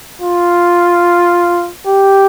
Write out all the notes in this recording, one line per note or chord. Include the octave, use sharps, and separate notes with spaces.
F4
G4